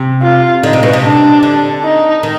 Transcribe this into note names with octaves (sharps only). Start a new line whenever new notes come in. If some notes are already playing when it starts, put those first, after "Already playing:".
Already playing: C3
F4
D3 D#4
C3
B2
C3
D4
D3
D#4
D#3